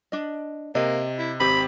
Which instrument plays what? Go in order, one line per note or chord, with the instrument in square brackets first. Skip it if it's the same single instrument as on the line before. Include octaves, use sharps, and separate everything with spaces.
[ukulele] D4 D#5
[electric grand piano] C3 [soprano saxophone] A#3 [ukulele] D#5
[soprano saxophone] E4
[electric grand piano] G#1 C4 G4 [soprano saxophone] B5